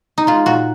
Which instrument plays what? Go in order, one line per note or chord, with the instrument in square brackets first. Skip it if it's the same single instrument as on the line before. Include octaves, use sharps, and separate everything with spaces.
[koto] D#4
G#3 F4
A#2 F#4